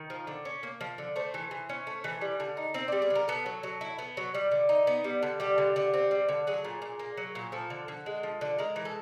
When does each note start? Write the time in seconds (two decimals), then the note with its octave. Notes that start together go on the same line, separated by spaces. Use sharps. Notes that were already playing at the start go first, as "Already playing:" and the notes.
Already playing: D#3
0.10 F3
0.27 D3
0.45 C#4
0.63 A#3
0.81 F3
0.98 D3
1.16 A3 C5
1.34 E3
1.51 E3
1.69 C#4
1.87 A3
2.04 E3
2.21 G3
2.40 D3
2.57 D#4
2.74 C4 C5
2.88 G3 D5
3.02 G#4
3.10 D3
3.15 A#4
3.28 B3 A4
3.46 F#3
3.63 F#3
3.81 E4
3.99 B3
4.17 F#3
4.34 G3
4.51 D3
4.69 D#4
4.87 B3
5.04 G3
5.23 D3
5.40 G3 G4
5.58 D3
5.76 D3
5.94 C4
6.11 G3
6.29 D3
6.47 F#3 G#4
6.64 A#2
6.82 A#2
6.99 A#3
7.17 F#3
7.35 A#2
7.52 F3 A4
7.70 D3
7.88 D3
8.06 G#3
8.23 F3
8.41 D3
8.58 G#3 A#4
8.76 E3
8.85 A4